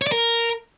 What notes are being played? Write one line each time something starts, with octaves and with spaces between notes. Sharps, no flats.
C#5
D5
A#4